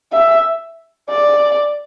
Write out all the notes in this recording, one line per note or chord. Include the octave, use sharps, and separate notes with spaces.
E5
D5